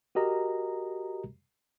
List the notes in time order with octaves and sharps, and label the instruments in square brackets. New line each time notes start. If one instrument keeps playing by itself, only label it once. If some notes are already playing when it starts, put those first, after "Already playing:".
[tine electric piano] F#4 G4 A#4 D#5 A#5